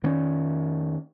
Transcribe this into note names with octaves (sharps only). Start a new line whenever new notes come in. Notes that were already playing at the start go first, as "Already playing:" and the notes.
F2 D#3 A#3 C#4